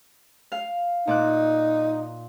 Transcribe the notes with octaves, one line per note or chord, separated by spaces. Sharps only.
F5
A#2 D#4 D5 F#6